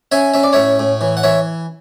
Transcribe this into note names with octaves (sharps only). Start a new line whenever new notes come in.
C#4 E5 G#5
C#4 E5
D5
A2 C#5 E5
A2
E3
F#5
E3 C#5 E5